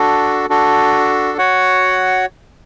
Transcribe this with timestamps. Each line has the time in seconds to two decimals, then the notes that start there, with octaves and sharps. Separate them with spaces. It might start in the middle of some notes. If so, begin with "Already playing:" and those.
Already playing: D4 F#4 A4
0.50 D4 F#4 A4
1.38 F#4 C#5 F#5